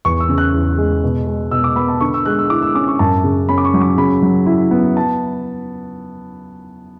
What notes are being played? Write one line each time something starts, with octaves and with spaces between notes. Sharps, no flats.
E2 C#6
E6
C#3
F#6
E2
G#3
B2
G#3
B2 E6
D6
B3 B5
A5
D3 C#6
E6
G#3 F#6
E6
E4 D6
E6
C#4 D6
C#6
F#2 A5
C#3
C#4 B5
D6
C#6
F#3
D6
C#3 B5
F#3
E4
B3
A5